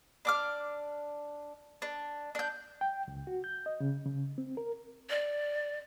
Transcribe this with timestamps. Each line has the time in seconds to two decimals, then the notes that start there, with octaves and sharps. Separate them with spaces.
0.25 D4 D6 F6
1.82 D4
2.35 D4 G6
2.81 G5
3.08 C#2
3.27 F#4
3.44 G6
3.66 D#5
3.80 C#3
4.06 C#3
4.38 C4
4.57 A#4
5.09 D5